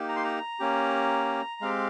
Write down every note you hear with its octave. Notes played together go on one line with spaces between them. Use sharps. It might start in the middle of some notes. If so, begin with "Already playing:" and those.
Already playing: A#3 D#4 G4
A#5
C6
A#5
A#3 C#4 G4
G#3 C4 G4 F5